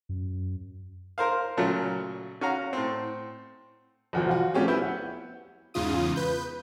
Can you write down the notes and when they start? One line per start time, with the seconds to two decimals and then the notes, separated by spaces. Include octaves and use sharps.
0.09 F#2
1.18 A#4 C5 F5
1.57 A#2 C#3 F#3 A3
2.41 C#4 F#4 F5 A#5
2.73 A2 C4
4.13 G1 E2 B2 F3
4.28 F4 F#4
4.54 F3 G3 A3 C#4 G4 G#4
4.68 B3 E4 G6
4.83 F#5
5.74 E2 G#2 C#3 F4 D#6
6.16 B4 G6